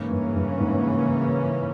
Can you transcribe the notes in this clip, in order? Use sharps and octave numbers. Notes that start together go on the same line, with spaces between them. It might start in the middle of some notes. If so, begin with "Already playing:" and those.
Already playing: G#2 C#3 E3 A#3 C#4
G2
G2
G#2